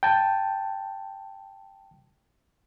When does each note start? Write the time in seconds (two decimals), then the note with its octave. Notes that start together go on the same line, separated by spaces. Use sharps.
0.03 G5 A5